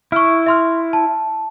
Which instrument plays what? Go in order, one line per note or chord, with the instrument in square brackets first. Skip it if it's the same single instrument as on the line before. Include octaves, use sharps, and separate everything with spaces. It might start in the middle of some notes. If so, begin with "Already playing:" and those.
[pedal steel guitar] E4 [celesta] C#6 F6
[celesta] E5 C6 F6
A5